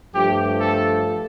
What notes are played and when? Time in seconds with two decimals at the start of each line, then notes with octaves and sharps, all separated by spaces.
0.14 G2 F3 A3 G4
0.59 A4